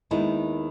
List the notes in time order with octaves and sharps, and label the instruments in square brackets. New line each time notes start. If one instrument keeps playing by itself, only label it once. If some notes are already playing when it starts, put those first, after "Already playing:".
[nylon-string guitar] D#2 D#3 G#3 B3 [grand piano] E4